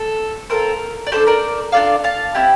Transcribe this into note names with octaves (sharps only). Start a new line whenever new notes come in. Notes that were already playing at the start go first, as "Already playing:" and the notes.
Already playing: A4
C4 F4 A4 A#4
D5
D4 G4 A4 C5
A#4 D5
D4 F4 A4 D5 F5
F5 A5
C4 E4 G4